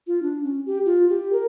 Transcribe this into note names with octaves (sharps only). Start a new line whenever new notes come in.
F4
D4
C#4
G4
F4
G4
A#4